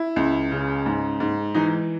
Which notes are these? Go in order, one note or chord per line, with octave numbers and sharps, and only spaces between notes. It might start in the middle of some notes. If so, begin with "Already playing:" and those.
Already playing: E4
C#2
C#3
G#2
G#2
E3 D#4